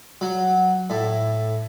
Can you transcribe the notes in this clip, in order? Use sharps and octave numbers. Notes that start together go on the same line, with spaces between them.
F#3
A2